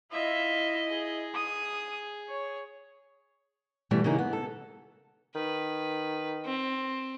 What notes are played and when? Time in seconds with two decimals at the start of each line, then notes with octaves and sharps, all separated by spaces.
0.12 E4 F4 D#5 E5
0.89 G#4
1.34 D#6
2.28 C#5
3.91 B2 E3 G3 A3
4.04 C#3 E3 A#3 D#4 G#4
4.18 B3
4.33 A4
5.35 D#3 B4
6.45 C4